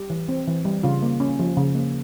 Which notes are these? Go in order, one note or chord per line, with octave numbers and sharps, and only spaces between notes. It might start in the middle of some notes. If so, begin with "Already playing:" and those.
Already playing: G3 G4
E3
C4
E3
G3
C#3 F4
A#3
C#4
F3
C#3
A#3